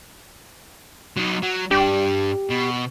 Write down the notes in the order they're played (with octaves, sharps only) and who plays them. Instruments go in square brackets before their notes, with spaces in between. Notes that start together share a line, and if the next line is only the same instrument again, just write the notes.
[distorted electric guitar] F#3 D#4
F#3
[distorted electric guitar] G2 D4 [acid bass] G4
[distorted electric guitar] B2